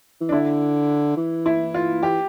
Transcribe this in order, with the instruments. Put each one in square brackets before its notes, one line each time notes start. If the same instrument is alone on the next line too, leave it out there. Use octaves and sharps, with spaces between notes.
[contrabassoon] E3
[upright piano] D4
[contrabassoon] D3 [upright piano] E4
[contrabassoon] E3
[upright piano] E4
F4
[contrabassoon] E3 [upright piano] G4